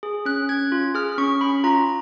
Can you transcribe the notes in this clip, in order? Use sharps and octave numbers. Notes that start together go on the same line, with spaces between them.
G#4
C#4 F#6
C#4 G#6
F4
G#4 F6
C#4 C#6
C#4 B5
F4 A#5